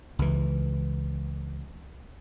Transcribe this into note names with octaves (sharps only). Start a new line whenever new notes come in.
C#2 E3